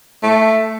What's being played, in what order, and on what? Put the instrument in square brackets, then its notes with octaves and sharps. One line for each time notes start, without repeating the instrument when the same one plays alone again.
[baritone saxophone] A3